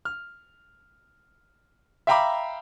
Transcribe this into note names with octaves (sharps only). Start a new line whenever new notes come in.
F6
E5 F5 G5 A#5 B5 D6